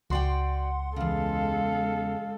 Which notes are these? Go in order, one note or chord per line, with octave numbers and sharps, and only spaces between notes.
C#2 F#4 D5 F#5 G5 C6
E2 C#3 G#3 A4 F5